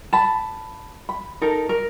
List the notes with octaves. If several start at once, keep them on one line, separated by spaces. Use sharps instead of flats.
A5 B5
B5
D#4 A4 A#4
A#4